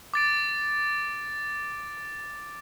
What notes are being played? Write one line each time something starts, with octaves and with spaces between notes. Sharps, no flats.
D6 A6 D7